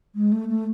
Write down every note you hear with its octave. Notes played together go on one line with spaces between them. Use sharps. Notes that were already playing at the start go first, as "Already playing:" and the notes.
G#3
A3
A3